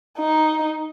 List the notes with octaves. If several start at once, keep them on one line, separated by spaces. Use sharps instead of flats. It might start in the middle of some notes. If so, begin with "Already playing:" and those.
D#4